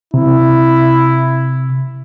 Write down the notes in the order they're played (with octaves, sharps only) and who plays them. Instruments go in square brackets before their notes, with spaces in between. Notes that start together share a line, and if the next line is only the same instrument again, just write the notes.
[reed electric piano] C3 [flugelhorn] E4